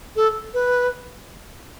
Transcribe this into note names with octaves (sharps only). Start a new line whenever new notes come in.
A4
B4